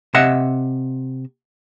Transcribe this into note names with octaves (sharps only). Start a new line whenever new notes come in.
C3 D#5 E5 F#5